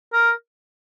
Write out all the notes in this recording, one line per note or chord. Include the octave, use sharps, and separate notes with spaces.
A#4